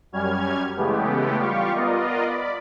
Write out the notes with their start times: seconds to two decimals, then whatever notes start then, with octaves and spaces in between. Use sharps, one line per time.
0.12 F#2 G3 C#4 F6 G#6
0.76 C#3 E3 G#3 A3 B3 G4
1.38 G3 F4 G4 F5 C#6
1.74 B3 F4 A#4 D5 D#5
2.25 D5 B5